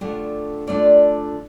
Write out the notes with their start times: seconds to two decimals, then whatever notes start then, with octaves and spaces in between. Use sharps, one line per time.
0.01 D3 A3 D4 F4 G4
0.67 D3 A3 D4 F4 D5